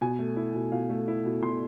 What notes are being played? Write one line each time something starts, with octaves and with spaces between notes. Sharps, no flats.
B2 G#5
A3
E4
B2
B2 F5
A3
E4
B2
B2 C6